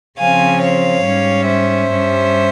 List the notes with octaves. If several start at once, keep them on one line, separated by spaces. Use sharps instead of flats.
C#3 F3 C4 F5 G#5
C#5 F5
G#2 G3 C#4
C5 E5
G2 G3 C#4